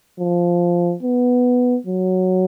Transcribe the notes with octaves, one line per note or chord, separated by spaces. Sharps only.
F3
B3
F#3